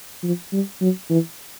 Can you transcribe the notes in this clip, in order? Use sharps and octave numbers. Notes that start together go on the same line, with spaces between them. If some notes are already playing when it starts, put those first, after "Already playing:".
F3
G3
F#3
E3